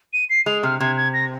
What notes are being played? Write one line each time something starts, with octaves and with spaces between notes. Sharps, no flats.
D#7
C7
G#3 F7
C3 F6
C3 G#6
G#6
A#6